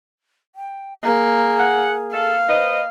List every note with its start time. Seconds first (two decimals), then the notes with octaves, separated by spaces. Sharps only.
0.55 G5
1.04 A#3 G#4
1.59 F#5
2.13 A4 F5
2.49 B4 C5 D#5